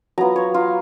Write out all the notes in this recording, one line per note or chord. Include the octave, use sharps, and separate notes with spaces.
F#3 B3 F4 A#5
C#5
F4